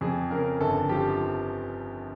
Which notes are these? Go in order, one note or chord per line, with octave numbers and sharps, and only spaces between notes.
F2 G#4
C#3 A#4
G1 A4
F3 G4